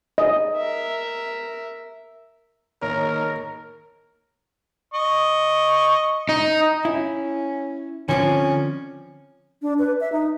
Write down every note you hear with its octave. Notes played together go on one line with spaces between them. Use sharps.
D#5
A#4 E5
D#3 A#3 A#4 C#5
D#5 C#6
D#4
C#4 E4
D3 F3 C4 C#4
D4
B4
E5
D#4